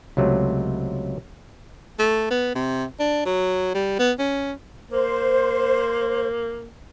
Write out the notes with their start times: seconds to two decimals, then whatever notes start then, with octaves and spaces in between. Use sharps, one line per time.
0.17 C#2 C3 F#3 A3
1.99 A3
2.30 B3
2.55 C3
3.00 D4
3.26 F#3
3.75 G3
3.99 B3
4.19 C#4
4.91 A#3 C5